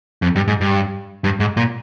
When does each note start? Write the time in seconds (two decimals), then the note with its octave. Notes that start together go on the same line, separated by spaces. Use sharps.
0.22 F2
0.36 G2
0.48 G#2
0.61 G2
1.24 G2
1.40 G#2
1.57 A#2